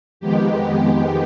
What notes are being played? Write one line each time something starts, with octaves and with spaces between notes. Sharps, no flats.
F2 D#3 G#3 B3 G4